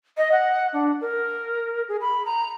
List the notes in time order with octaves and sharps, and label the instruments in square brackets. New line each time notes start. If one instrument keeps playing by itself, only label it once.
[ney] D#5
F#5
D4
A#4
G#4
B5
A#5